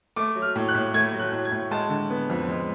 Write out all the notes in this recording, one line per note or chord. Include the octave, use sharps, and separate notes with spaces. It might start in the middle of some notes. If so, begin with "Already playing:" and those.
A3 D6
F#3
F6
A2
F#6
A2
A3 G#6
F#3
F#6
A2
G#6
A2
G#3 A5
D3
B3
F2
G#3